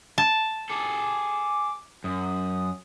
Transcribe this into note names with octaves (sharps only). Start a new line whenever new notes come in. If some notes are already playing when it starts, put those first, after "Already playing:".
A5
G#4 A4 D6
F#2 D#6